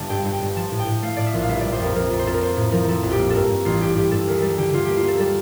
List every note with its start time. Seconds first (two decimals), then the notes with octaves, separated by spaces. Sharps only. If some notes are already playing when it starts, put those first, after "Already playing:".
Already playing: G1 G3 A5
0.09 G2 G5
0.25 G2
0.33 G5
0.41 G2
0.56 F3 A5
0.71 A2
0.79 G5
0.87 A2
1.02 A3 F5
1.17 A2 D5
1.26 E5
1.34 A#1
1.43 F5
1.49 G1 E5
1.60 G3 D5
1.72 C5
1.80 F2 A#4
1.95 F2 A#4
2.10 F2
2.19 C5
2.26 F2 A4
2.34 A#4
2.42 A#3 C5
2.56 A2
2.72 F3 A#4
2.88 F3 A4
3.03 A#1
3.11 G4
3.19 A#3
3.30 G2 A4 A#4
3.50 G2
3.65 A1 F4
3.81 G2 G4
3.96 G2 G4
4.11 G2 A4
4.27 D2 A#4
4.42 G3 A4
4.58 D3 G4
4.73 D3 F4
4.85 A#3 G4
4.97 F4
5.04 A#3 A4
5.20 G3 A4